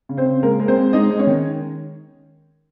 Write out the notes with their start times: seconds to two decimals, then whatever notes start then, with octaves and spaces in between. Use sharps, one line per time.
0.09 C#3
0.17 C4 C5
0.25 C#3
0.43 G#3 A#3 A#4
0.60 G#3
0.68 C4 C5
0.76 G#3
0.93 G#3 D#4 D#5
1.11 G#3
1.19 C#4 C#5
1.27 D#3